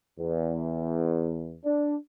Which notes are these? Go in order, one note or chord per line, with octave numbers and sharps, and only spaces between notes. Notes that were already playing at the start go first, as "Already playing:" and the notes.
E2
D4